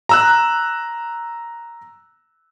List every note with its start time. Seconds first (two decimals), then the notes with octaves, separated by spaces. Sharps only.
0.09 A#5 E6 F#6